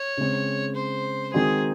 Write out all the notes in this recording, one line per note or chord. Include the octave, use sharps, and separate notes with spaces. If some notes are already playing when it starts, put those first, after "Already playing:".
Already playing: C#5
C#3 G#3 C4
C5
D#3 G#3 C4 D#4 F#4 G#4